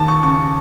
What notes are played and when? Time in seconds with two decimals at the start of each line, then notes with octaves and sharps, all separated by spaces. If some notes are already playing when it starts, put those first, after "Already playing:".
Already playing: D#2 A5
0.08 C#6
0.23 C#3 C#6